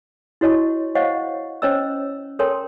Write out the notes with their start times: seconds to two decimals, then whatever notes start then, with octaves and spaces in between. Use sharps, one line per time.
0.41 E4 F#4 C#5 D#5 A5 C#6
0.95 C5 C#5 D#5 F5 F#5 C#6
1.62 C#4 C5 C#5 D#5 A#5 E6
2.39 A4 A#4 C#5 G5 A5 C6